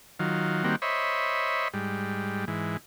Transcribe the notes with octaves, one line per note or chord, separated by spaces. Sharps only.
D#3 F#3 F4
D#3 G3 A#3 C4 F#4
C5 C#5 D#5 E5 B5
G#2 G3
G#2 E3